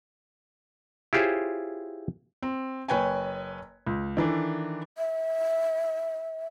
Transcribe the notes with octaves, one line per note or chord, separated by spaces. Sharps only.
E4 F4 G4 G#4 C5 C#5
C4
F#1 B4 C#5 G5 G#5
C#2
D#3 E3 D4 A4
E5